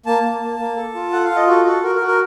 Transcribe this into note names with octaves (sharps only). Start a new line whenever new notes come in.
A#3 A5
A#3
A#3
A#3
A4
F4
A4 F#5
F5
F4
D#5
F#4 A4
F#4 A4
F#4 A#4
A#4
F#4
A#4